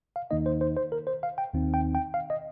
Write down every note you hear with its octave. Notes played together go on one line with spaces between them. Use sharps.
F5
D#2 D#3 A#3 D#4 D#5
C5
C5
C5
A#4
C5
F5
G5
D#2 D#3 C4 D#4
G5
G5
F5
D#5